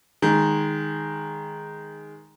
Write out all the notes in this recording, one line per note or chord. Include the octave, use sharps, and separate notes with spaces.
D#3 G#3